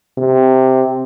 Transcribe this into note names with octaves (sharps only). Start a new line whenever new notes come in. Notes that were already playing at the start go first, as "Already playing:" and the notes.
C3